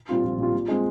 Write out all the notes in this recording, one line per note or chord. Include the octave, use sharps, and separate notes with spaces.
A#2 G3 C4 F4
A#1
A#2 G3 C4 F4
A#2
G#3 C4